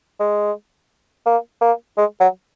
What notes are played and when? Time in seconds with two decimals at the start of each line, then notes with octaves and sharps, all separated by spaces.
0.20 G#3
1.26 A#3
1.61 A#3
1.97 G#3
2.20 F#3